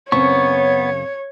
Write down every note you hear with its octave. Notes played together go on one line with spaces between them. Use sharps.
F#2 C#3 B3 C4 C#5 C#6